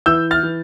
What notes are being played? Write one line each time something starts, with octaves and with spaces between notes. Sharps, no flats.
E3 E6 G6
F6 A6
E3